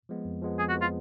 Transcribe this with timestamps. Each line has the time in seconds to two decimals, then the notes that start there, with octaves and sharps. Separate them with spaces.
0.09 F3 G#3 B3
0.25 F2
0.42 F3 G#3 B3
0.59 F2 G#4
0.69 F#4
0.76 F3 G#3 B3
0.81 F4